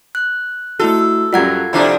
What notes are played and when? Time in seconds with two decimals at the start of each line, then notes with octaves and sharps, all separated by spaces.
0.15 F#6
0.80 A3 E4 F#4 A4
1.33 F#2 F#3 G3 F4 F#5 G#6
1.73 C3 F3 D4 E4 A4 D6